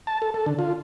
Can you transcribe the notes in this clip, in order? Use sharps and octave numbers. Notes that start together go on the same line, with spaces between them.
A5
A4
A4
D3
F4